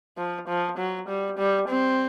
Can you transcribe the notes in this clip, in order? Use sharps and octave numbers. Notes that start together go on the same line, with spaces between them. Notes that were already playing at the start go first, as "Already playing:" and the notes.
F3
F3
F#3
G3
G3
C4